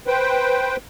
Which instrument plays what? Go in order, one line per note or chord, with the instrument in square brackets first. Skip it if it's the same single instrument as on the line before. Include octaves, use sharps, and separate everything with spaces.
[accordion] B4 C5 G5